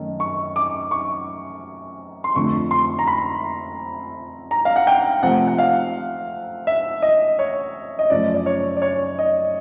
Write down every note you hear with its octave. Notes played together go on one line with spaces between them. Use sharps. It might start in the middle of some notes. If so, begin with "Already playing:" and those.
Already playing: F#2 D#3 A3
C#6
D6
C#6
C6
F2 D3 F3 A3 C#6
C6
A#5
B5
A#5
F5
F#5
G5
C3 F3 A3 F#5
F#5
F5
E5
D#5
C#5
D#5
F#2 C#3 F3 A3 D5
D5
C#5
D5
C#5
D#5